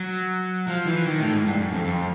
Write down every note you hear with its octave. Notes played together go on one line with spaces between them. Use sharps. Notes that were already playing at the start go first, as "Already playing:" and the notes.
Already playing: F#3
F3
E3
D#3
A2
G#2
G2
F#2
F2
F2